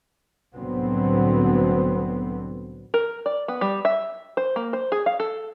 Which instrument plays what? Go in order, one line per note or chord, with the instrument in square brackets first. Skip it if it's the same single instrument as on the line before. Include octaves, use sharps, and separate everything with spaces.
[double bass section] C2 A2 D3 F#3 B3 C4
[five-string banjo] A#4
D5
B3
G3
E5
C5
A#3
C5
G#4
F5
A4